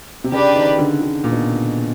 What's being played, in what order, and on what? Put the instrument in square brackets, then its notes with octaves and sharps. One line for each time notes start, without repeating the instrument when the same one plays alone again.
[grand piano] C3
[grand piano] C#3 [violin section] D4 G4 B4 D5
[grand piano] D#3
D3
D3
A#2
B2